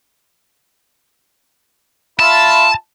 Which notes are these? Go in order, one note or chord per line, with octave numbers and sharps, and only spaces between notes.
F4 E5 A5 B5